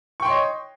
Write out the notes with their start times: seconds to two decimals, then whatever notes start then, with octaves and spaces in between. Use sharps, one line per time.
0.20 C#6
0.22 G5
0.25 C6
0.28 C#5
0.30 D#5